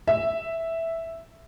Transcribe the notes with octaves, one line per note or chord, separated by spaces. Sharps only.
E5